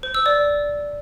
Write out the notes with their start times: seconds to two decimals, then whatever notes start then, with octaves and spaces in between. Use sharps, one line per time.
0.03 C5
0.14 E6
0.26 D5